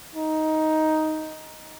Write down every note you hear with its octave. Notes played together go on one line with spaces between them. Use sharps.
D#4